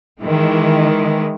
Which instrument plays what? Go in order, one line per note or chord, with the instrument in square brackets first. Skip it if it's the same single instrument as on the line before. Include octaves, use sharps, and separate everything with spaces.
[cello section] D#3 E3 G#3